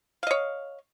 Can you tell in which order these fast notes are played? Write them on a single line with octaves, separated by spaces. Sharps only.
F5 D#5 C#5